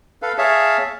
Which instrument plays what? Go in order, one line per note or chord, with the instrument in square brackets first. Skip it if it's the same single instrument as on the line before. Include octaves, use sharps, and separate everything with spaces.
[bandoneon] A4 B4 F5
G#4 C#5 E5 F5 A5